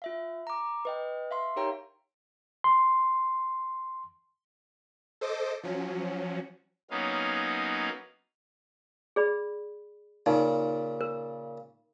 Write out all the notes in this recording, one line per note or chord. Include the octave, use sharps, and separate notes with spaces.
F4 E5 F5
A#5 D6
B4 D#5 G5
E5 F5 C6
D#4 G4 A#4 C#5 G5 A#5
C6
A4 C5 D#5 D6
F3 F#3 C#4
F#3 A#3 B3 C#4 D#4 F5
G#4 D5 B5
A#2 C#3 D#4
A#4